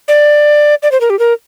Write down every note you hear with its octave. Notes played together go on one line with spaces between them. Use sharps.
D5
D5
C5
A#4
G4
A#4